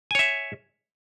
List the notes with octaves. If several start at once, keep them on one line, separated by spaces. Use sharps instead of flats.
C#5 E5 G#5